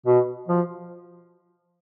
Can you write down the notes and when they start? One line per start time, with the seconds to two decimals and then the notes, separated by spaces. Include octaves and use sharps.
0.06 B2
0.48 F3